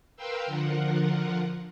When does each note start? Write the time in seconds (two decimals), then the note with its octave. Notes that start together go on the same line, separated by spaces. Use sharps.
0.16 A#4 B4 F5 G5 C6 E6
0.46 D3 F3 F4 A#4 F#5